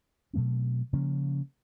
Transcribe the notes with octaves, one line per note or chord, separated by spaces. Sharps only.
B2 F#3 A3 C4
C#3 F3 A#3 C#4